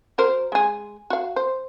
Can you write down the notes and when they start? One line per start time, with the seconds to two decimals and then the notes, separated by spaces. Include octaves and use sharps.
0.18 F#4 A#4 C5
0.52 G#3 G#4
1.10 F#4 F5
1.36 C5